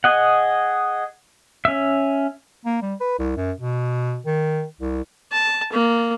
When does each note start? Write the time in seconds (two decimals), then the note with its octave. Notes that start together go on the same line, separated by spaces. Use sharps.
0.04 G#4 D#5 F#5
1.65 C#4 E5
2.65 A#3
2.82 G3
3.00 B4
3.19 C2
3.36 F#2
3.60 B2
4.26 D#3
4.80 C2
5.32 A5
5.72 A#3